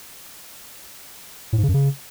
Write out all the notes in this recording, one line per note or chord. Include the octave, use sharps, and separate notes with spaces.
A2
G#2
C#3
F#2
C#3